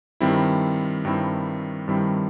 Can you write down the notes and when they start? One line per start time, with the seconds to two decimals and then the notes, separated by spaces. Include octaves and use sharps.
0.20 G2 D#3 G3 C4 E4
1.05 G2 D#3 G3 C4 E4
1.88 G2 D#3 G3 C4 E4